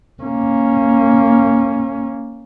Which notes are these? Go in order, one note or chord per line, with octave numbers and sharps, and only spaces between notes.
A#3 C#4